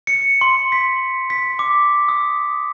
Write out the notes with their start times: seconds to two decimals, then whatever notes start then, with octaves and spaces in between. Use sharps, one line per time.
0.07 C#7
0.41 C6
0.72 B6
1.30 B6
1.59 D6
2.09 D#6